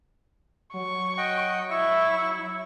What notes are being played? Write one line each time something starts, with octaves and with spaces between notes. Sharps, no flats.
F#3 C#6
D#5 F#5 G5
E4 E5 C#6